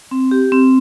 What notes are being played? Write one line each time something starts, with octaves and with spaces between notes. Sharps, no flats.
C4
G4
C4